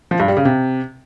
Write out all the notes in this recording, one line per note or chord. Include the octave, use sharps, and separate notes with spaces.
F3
G2
G3
C#3
C3